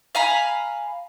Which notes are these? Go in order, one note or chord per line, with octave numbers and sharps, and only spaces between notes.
F5 G#5 A#5 B5